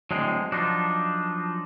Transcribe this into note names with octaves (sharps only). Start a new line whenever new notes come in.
A2 D3 F#3 G#3 C4
F3 F#3 D4 D#4 F4